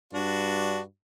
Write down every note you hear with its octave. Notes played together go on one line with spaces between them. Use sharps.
G2 D4 F#4